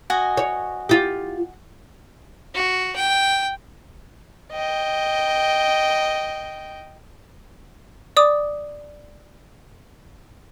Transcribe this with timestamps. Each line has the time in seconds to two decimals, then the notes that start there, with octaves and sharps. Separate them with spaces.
0.10 F#4 D#5 G#5
0.37 C#5
0.89 F4 G4
2.55 F#4
2.96 G5
4.53 D#5 G5
8.17 D5 D6 D#6